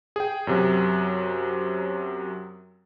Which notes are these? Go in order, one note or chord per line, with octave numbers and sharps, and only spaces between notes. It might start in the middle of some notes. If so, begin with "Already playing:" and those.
G#4 G5
F#2 C3 F#3